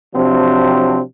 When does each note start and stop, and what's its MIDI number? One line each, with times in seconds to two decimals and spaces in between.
0.15 1.01 48
0.15 1.01 53
0.15 1.01 54
0.15 1.01 60
0.15 1.01 62